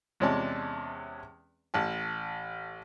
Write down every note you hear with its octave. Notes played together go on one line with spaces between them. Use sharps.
E2 C3 G#3 C#4 D5 A5
A1 A5